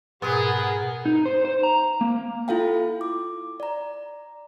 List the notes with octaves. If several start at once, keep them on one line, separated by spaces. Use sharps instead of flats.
G#2 B2 B3 G#4 A#4 F#6
D#4
C5
C5
A#5
A#3
E4 F4 A4 F5 G5
D6
D5 A#5